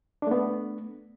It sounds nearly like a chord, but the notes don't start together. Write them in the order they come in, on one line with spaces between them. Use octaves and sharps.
D4 A3 B3